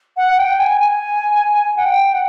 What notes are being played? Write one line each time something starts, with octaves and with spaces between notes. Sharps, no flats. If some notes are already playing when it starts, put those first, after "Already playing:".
F#5
G5
G#5
G#5
F#5
G5
F#5